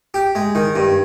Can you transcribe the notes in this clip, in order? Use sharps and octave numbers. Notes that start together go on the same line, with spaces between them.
G4
G#3
D#3
G2